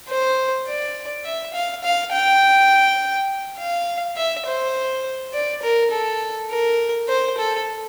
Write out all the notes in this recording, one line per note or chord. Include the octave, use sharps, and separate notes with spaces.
C5
D5
E5
F5
F5
G5
F5
E5
C5
D5
A#4
A4
A#4
C5
A4